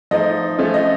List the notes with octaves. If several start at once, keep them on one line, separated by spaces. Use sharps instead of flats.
F3 A3 D#4 D#5
F3 A3 C#4 F4
D#5